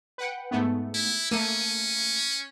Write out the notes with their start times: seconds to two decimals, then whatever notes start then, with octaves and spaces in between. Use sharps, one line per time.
0.18 B4 F#5 G5
0.51 G#2 A3 B3
0.94 E4
1.31 A3 A#3 C#4 D#7